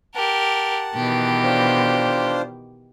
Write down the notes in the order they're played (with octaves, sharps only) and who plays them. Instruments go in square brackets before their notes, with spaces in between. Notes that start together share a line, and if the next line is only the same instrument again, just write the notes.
[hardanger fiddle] G4 A#4 [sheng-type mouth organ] F#5 A5
[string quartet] B2 D#3 E3 [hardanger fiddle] G4
[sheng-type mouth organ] D4 F4 C5